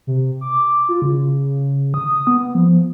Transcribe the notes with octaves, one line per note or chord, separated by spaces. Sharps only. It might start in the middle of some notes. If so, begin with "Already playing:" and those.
C3
D6
F4
C#3
D#6
B3
F3